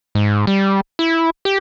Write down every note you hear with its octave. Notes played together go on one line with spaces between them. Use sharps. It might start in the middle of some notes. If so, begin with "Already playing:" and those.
G#2
G3
E4
G4